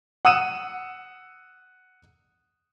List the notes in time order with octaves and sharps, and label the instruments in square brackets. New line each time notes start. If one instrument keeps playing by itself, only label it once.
[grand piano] F#5 D#6 E6 D#7 E7